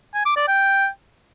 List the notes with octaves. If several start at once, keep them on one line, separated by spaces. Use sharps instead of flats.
G#5
D6
D5
G5